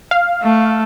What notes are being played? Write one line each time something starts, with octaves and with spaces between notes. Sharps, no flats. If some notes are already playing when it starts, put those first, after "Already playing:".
F5
A3